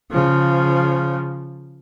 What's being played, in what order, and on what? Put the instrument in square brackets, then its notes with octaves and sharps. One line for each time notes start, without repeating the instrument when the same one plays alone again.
[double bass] C#3 F3